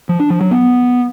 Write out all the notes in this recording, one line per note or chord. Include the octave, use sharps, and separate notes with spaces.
F3
D4
F3
F#3
B3